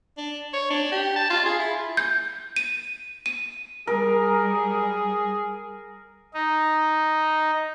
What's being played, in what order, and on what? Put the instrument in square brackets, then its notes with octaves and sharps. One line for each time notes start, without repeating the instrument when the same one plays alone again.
[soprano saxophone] D4
C#5
D4
G4
A5
F4
G#4
E4
[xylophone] G6
D#7
D#7
[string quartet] G3 [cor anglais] G#4 [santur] A#4
[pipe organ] D#4